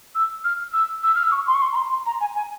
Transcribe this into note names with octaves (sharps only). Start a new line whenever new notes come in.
E6
F6
E6
E6
F6
E6
C#6
C6
C#6
C6
A#5
C6
C6
A#5
G#5
G#5